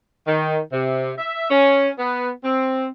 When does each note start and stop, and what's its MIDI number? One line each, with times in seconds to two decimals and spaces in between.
0.27 0.58 51
0.73 1.14 48
1.18 1.50 76
1.50 1.90 61
1.99 2.29 59
2.44 2.87 60